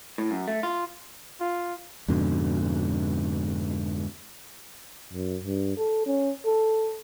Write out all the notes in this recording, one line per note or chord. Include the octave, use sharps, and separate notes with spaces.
A2
F#2
A3
F4
F4
F2 G#2 B2 D3
F#2
G2
A4
C#4
A4